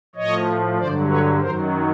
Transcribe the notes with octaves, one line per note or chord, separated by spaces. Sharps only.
A2 F3 C#5 D#5
G2 D3 F#3 C5 D5
B4 C#5
F#2 D#3 F#3 A#4 C5